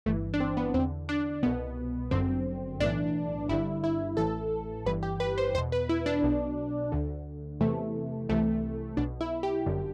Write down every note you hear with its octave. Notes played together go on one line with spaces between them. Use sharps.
G1 G2 E3 A3
D4
C4
B3
E2 D3 C4
D4
C2 B2 B3
G1 F#2 D3 C4
B1 A2 E3 D4
G1 G2 D3 E4
E4
A1 A2 E3 A4
G1 G2 E3 B4
G4
B4
C5
E2 B2 C5
B4
E4
D4
B1 B2
D2 D3
E2 C3 E3 A3
C2 C3 E3 A3
B1 B2 D4
E4
G4
G1 F#2 D3